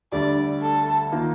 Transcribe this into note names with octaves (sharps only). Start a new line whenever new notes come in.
D2 D3 G3 D5
A4
D#3 A#3 F4